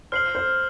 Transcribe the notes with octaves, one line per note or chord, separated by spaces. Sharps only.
C5 F6 C7 F#7
C5